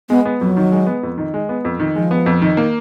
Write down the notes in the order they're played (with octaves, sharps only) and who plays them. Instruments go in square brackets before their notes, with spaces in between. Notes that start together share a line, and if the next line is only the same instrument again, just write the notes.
[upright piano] G#3 [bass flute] B3
[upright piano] B3
[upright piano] F2 [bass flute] F#3
[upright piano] D#3
G#3
B3
F2
D#3
G#3
B3
F2
D#3
[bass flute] F3 [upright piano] G#3
[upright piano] B3
F2
D#3
A#3